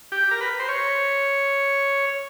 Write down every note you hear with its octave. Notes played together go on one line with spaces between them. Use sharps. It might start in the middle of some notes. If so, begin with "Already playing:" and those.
G4
A#4
B4
C5
C#5